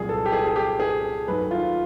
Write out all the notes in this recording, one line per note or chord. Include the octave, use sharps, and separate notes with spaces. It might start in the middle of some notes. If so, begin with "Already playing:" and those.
Already playing: C2 A#2 F#3 G#4
A4
G4
G#4
G#4
G4
G#4
D#2 D#3 F#3 A3 B4
F4